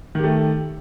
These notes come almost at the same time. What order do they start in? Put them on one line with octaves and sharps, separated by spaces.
D#3 G4 A3